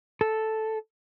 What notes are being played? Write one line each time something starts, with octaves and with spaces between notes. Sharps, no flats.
A4